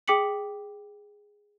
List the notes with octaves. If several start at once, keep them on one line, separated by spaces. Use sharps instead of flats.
G#4 G5 D6 B6 C#7 F#7